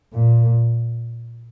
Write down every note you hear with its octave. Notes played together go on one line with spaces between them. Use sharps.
A#2